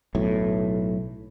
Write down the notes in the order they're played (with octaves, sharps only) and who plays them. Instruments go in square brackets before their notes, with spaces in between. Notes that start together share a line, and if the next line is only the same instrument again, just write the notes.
[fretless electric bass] B1 A2